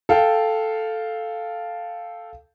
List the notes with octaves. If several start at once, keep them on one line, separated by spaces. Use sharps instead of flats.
A4 F5 G5